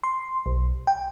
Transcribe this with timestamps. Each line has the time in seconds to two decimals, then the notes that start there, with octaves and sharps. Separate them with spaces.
0.04 C6
0.46 B1
0.87 G5